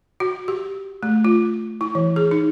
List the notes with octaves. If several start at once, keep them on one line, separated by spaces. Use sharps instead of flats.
F#4
G4
A3
F4
E4
E3
G#4
D#4